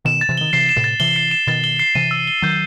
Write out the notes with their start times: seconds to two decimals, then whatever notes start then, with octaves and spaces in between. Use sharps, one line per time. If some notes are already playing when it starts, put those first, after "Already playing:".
0.05 B2 D#3 E7
0.21 A6
0.29 C3 E3
0.38 D#3 G7
0.53 C3 E3 C7
0.69 E7
0.76 A2 C3
0.84 A6
1.00 C3 E3 G7
1.16 C7
1.31 E7
1.47 B2 D#3 A6
1.64 G7
1.79 C7
1.95 C3 E3 D#7
2.11 E6
2.28 G7
2.42 D#3 F#3 G6